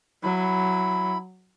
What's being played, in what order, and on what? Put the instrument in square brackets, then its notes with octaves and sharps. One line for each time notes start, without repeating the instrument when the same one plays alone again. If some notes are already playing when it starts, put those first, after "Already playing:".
[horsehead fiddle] F#3 [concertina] E4 B5